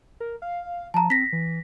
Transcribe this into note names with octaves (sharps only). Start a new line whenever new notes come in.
A#4
F5
F3 A5 A#5
C4 A#6 B6
E3